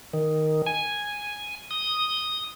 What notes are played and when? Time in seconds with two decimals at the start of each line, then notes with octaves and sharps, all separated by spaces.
0.13 D#3
0.67 G#5
1.71 D#6